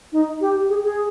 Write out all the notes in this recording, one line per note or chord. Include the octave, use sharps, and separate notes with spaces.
D#4
G4
G#4
G#4